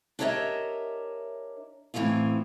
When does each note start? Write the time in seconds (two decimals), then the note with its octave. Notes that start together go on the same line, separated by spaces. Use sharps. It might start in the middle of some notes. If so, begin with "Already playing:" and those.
0.19 D4 G4 A#4 C#5 D#5 E5
1.94 A2 E3 C4 C#4 F4